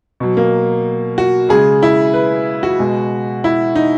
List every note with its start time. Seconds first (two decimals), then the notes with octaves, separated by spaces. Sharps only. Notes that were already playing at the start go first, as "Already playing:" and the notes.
0.20 B2 F#3
0.37 A#3
1.18 F#4
1.49 C#3 G#3 G#4
1.83 E4
2.14 B4
2.63 F#4
2.80 B2 G#3
3.44 E4
3.76 D#4